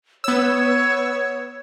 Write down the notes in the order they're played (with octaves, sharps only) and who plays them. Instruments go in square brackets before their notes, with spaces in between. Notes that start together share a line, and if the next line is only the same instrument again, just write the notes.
[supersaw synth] B3 E6 [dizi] C#5